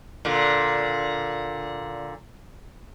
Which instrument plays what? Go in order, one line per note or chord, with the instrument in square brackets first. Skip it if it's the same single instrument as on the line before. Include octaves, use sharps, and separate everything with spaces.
[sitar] A#2 D3